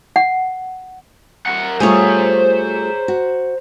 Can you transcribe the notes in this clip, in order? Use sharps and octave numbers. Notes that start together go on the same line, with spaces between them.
F#5
A#4 F#5
G3 A3 F4 G#4 C5 C#5 A#5
F#4